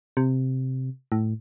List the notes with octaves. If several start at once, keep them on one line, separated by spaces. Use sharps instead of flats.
C3
A2